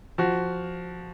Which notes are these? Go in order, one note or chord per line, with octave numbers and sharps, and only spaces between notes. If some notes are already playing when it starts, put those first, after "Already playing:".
F3 F#4